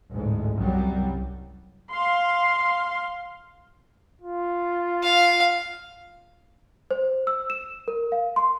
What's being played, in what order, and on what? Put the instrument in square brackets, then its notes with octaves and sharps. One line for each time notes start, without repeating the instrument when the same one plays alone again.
[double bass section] A1 D2 G#2
C2 F#2 F#3 G3
[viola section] F5 C6
[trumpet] F4
[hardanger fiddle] F5
[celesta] C5
E6
E7
A#4
F5
C6